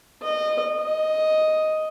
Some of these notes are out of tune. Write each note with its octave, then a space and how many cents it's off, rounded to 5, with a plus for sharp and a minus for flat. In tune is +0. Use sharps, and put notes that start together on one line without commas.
D#5 -25
D#5 +5